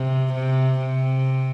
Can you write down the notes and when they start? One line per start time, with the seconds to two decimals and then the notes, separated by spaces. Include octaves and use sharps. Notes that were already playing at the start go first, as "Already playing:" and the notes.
Already playing: C3
0.34 C3
0.79 C3